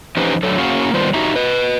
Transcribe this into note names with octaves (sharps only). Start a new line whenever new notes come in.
E3 F3 C#4 D#4 G4 B4
D3 F#3 A3 A4
A#3 C#4 F#4 G#4 F5 F#5
D#3 G3 B3 F4 B4 C5
D#4 F#4 G4 D#5 E5 A#5
B4 D#5